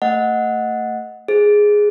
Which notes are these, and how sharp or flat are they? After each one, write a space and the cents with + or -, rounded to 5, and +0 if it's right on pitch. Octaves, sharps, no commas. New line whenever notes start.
A3 +35 D#5 +5 F#5 -10
G#4 +0 C5 +0